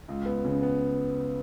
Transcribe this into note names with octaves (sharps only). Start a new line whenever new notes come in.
C#2
B3
C#3
B3